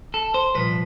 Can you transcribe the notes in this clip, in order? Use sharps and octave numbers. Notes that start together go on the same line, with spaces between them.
A4
C5
C2 A#2 F3 B4